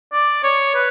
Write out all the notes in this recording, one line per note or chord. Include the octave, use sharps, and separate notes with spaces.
D5
C#5
B4